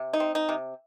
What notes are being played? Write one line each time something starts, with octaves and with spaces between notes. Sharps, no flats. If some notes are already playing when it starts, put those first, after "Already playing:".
Already playing: C3
D#4
C4
D#4
C3